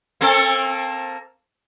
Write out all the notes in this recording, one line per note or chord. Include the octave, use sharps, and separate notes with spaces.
A#3 C4 A4